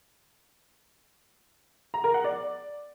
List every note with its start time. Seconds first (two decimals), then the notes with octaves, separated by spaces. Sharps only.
1.94 A#5
2.04 A#4
2.14 F#5
2.24 D5